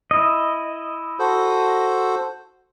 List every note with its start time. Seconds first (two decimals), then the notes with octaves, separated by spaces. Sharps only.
0.11 E4 D#5
1.19 F#4 A4 C5